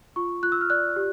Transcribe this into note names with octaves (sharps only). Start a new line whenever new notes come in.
F4 C#6
F4 F#6
E6
F6
D5 F#6
G4